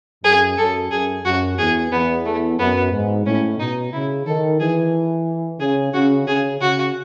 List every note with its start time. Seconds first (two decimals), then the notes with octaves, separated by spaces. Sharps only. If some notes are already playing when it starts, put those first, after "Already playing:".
0.24 F#2 G#4
0.58 F#2 A4
0.91 F#2 G#4
1.25 F#2 F#4
1.58 E2 G#4
1.91 E2 B3
2.25 A3
2.59 F#2 B3
2.92 G#2
3.26 A2 C#4
3.59 B2 D#4
3.92 C#3 E4
4.26 D#3 A4
4.60 E3 G#4
5.60 C#3 G#4
5.93 C#3 F#4
6.27 C#3 G#4
6.61 C#3 F#4